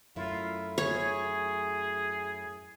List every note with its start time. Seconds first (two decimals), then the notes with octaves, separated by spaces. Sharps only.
0.16 F#2 A3 E4 F4
0.78 G#4 C#5